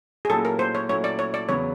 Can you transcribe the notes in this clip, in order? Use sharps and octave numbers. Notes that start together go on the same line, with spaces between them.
G#4
A#2 F#3 A3 C#4 E4 A4
A#4
C5
C#5
A#2 F#3 A3 C#4 E4 C#5
D5
C#5
D5
E2 C#3 F#3 B3 C#5